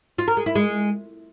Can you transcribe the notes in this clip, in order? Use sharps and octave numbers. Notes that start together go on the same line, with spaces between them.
F4
A#4
G#3
E4
G#3